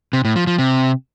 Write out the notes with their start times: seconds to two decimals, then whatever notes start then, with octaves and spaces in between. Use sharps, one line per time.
0.13 C3
0.25 A2
0.36 F3
0.47 F3
0.59 C3